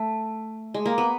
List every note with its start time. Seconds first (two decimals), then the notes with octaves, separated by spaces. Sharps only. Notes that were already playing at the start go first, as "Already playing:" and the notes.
Already playing: A3
0.74 G#3
0.86 A#3
0.98 B3